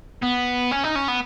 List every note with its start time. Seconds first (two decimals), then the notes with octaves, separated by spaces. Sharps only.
0.23 B3
0.71 C#4
0.84 D#4
0.95 C#4
1.08 B3